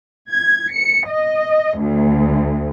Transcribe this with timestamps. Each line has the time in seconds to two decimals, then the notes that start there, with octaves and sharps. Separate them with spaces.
0.29 G#6
0.74 C#7
1.10 D#5
1.81 D2